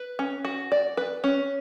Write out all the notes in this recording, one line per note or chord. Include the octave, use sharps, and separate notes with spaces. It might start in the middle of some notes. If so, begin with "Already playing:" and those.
Already playing: B4
C#4
F#4
D5
B4
C#4